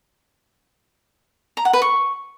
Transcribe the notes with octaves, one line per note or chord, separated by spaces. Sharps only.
A#5
F#5
B4
C#6